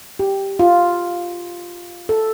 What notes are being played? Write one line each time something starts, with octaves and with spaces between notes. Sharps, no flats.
G4
F4
A4